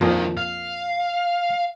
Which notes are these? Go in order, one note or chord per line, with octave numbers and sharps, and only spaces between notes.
A#1 F2 A#2 D#3 F3
F5